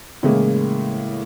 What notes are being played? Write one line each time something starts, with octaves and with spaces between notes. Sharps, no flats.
A2 C#3 E3 G#3 A#3